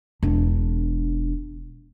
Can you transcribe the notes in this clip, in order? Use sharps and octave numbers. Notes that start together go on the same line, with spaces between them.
E1 D4